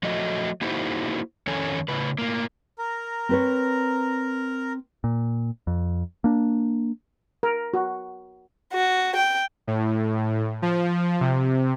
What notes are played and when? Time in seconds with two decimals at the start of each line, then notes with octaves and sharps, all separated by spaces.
0.03 F3 F#3 A3 F#4 D#5
0.61 A#3 D#4 E4 F#4 G#4 C5
1.47 F2 D#3 C#4 A4 C#5 G#5
1.88 A2 C#3 B4
2.19 A2 A#3
2.79 A#4 A#5
3.29 C4 B4 C#5
5.04 A#2
5.67 F2
6.24 A#3 D4
7.43 A#4
7.74 F#4
8.73 F#4
9.16 G5
9.67 A2
10.62 F3
11.21 C3